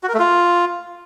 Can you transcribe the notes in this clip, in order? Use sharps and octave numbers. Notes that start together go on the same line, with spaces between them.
F#4
A#4
A3
F4